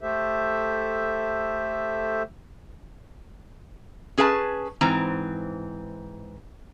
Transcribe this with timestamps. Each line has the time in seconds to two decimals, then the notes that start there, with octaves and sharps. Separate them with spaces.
0.01 A3 G4 A4 C5 E5
4.18 C#4 G#4 B4 F5 A5
4.81 G#2 E3 C4 A#5